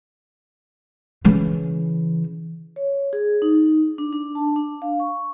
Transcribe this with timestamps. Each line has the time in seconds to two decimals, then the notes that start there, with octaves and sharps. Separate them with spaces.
1.25 C#3 E3
2.76 C#5
3.13 G#4
3.42 D#4
3.98 D4
4.13 D4
4.35 A5
4.56 D4
4.82 F5
5.00 C#6